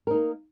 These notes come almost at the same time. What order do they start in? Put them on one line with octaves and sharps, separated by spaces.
A#4 D#4 A#3